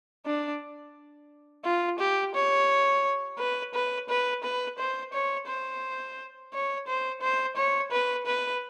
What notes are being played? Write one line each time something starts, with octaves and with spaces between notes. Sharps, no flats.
D4
F4
G4
C#5
B4
B4
B4
B4
C5
C#5
C5
C#5
C5
C5
C#5
B4
B4